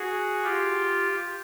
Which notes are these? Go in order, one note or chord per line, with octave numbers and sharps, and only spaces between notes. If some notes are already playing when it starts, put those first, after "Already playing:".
Already playing: F#4 G#4
F4 G4